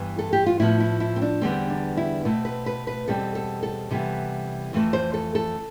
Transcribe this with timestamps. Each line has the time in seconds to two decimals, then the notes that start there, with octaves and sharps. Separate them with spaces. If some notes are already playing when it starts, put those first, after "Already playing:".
Already playing: G2 E3 B3
0.19 A4
0.33 G4
0.46 F4
0.60 A2 F3 B3 E4
0.80 E4
1.00 E4
1.16 C4
1.22 D4
1.42 E2 D3 G3 B3 C4
1.70 D4
1.97 E4
2.25 B2 A3 C4 B4
2.45 B4
2.66 B4
2.87 B4
3.08 E2 B2 G3 C4 A4
3.35 A4
3.63 A4
3.90 C3 E3 G3 B3
4.73 F2 E3 A3 C4
4.93 C5
5.14 A4
5.35 A4